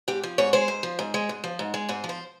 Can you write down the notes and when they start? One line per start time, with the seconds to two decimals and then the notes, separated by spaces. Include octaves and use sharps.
0.08 G#2 G4
0.23 F3
0.38 G#2 C#5
0.53 G#3 C5
0.68 G#2
0.83 F3
0.99 G#2
1.14 G#3
1.29 G#2
1.44 F3
1.59 G#2
1.74 G#3
1.89 G#2 C5
2.04 F3
2.09 C5